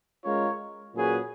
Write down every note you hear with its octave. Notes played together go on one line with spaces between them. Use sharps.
G#3 C#4 F4 A#4 C#5
A#2 F#3 C#4 G#4 B4